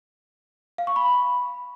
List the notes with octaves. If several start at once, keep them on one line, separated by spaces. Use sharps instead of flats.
F5
C#6
B5